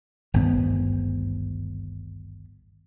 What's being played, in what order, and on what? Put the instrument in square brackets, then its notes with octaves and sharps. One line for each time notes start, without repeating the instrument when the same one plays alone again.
[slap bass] G#1 D2 G2 B3